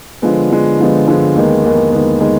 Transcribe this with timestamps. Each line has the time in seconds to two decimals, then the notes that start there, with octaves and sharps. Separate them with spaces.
0.22 D3 F3 G#3 B3
0.50 D3 F3 G#3 B3
0.78 D3 F3 G#3 B3
1.07 D3 F3 G#3 B3
1.35 D#2 D#3 G#3 B3
1.63 D#2 D#3 G#3 B3
1.92 D#2 D#3 G#3 B3
2.21 D#3 G#3 B3